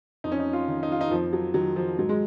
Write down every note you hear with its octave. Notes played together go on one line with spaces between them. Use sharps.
F2 D#4
C#4
D#4
F4
D#3
D#4
F4
D#4
F2 F3
F#3
D#3 F#3
F3
G#2 F#3
G#3